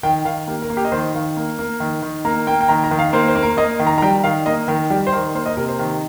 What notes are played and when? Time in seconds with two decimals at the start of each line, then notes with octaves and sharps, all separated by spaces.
0.03 D#3 G5
0.25 D#3 F5
0.47 A#3 G4
0.62 A#4
0.70 A#3
0.77 G4
0.85 D#5
0.92 D#3 C5
1.14 D#3 F5
1.37 A#3
1.59 A#3
1.80 D#3
2.02 D#3
2.25 A#3 A#5
2.47 A#3 G5
2.61 G5
2.69 D#3 A#5
2.84 A#5
2.91 D#3
2.99 F5
3.13 A#3 C5
3.28 C5
3.35 A#3
3.43 A#4
3.57 A#3 D#5
3.80 D#3
3.87 A#5
3.98 A#5
4.02 G3 G5
4.24 D#3 F5
4.46 A#3 D#5
4.68 D#3 A#4
4.90 G3 G4
5.07 C5
5.13 D#3 A#4
5.35 A#3 C5
5.46 D#5
5.57 C3 A#4
5.68 C5
5.79 D#3